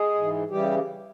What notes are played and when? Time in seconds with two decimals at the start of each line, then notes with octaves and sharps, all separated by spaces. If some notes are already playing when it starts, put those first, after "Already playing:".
Already playing: G#3 G#4
0.15 G#2 E3
0.50 C#3 E3 G3 G4